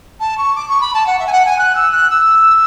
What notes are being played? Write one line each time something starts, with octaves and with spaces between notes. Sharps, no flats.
A5
C#6
D6
C#6
B5
A5
F#5
E5
G#5
F#5
G#5
F#6
E6
F#6
E6